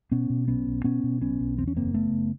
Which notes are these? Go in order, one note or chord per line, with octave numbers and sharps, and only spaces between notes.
B2 B3 C#4
B2
B1 B3 C#4
B1
B2 B3 C#4
B2
B1 B3 C#4
B1
E2 C4
C#4
F#1 A#3 C4
C#3 A3 B3
F#1